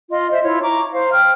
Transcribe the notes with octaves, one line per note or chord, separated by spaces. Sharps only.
F4 D#5
C5 E5
E4 F4 C#5
A#5 C#6 D6
C5 F5
G5 F6